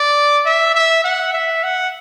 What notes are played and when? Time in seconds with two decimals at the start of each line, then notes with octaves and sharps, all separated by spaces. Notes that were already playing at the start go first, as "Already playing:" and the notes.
Already playing: D5
0.46 E5
0.74 E5
1.04 F#5
1.33 E5
1.63 F#5